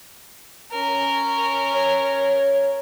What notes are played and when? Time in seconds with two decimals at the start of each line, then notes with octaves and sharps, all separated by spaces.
0.71 C#4 A#4
1.73 C#5